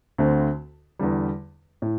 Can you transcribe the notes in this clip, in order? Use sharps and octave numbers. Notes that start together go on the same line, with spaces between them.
D2 D3 A3 C4
E2 D3 G3
A2